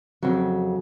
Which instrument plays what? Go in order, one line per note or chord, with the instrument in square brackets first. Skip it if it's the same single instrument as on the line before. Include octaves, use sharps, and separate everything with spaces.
[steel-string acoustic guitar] F2 C#3 F#3